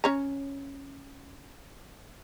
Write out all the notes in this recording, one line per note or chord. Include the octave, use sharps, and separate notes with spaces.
C#4 C#5 A#5